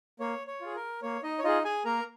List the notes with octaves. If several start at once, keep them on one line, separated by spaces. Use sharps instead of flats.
A#3 C#5
C#5
F4 G#4
A#4
A#3 C#5
D#4 D#5
C#5
D#4 F4 G#4 D#5
G#4 G#5
A#3 A#4 A#5